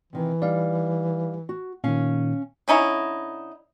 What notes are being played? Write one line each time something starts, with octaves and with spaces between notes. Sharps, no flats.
C3 D#3 E3
G3 D#4 D5 F5
F#4
A#2 D#3 C#4 F5
D3 C#4 D#4 E4